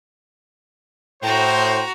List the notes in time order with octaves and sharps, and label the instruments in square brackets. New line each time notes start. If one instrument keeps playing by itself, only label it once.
[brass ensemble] A2 C5 [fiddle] F#4 A#5 [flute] G5